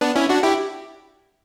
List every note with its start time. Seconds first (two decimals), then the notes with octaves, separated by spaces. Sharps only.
0.01 B3 D4
0.15 C#4 E4
0.29 D4 F#4
0.43 E4 G4